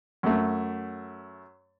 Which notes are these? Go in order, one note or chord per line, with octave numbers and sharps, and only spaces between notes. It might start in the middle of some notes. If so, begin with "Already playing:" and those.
F#2 A3